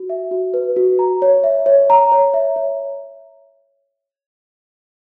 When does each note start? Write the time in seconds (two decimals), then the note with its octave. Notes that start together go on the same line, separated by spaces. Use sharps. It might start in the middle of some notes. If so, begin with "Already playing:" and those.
Already playing: F#4
0.10 E5
0.31 F#4
0.54 B4
0.76 F#4
0.99 A#5
1.22 C#5
1.44 E5
1.66 C#5
1.90 A#5
2.12 C#5
2.34 E5
2.56 C#5